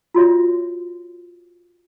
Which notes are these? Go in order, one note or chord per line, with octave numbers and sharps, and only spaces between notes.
F4 F#4 C#5 E5